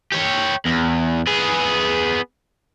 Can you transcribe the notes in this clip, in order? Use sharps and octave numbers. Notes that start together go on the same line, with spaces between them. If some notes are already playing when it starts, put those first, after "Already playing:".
G4 C#5
E2
B3 G#4